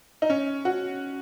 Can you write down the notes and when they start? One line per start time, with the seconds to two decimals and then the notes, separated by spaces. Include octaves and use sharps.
0.22 D#4
0.30 C#4
0.65 F#4